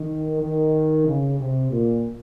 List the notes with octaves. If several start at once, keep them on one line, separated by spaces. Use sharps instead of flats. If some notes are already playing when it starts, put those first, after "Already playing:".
Already playing: D#3
D#3
C#3
C3
A#2